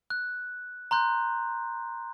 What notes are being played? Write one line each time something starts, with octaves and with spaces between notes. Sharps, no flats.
F#6
A#5 C6 F#6 G6